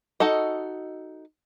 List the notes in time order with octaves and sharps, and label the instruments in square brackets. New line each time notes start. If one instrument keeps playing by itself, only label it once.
[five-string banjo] D#4 F#4 A4 D#5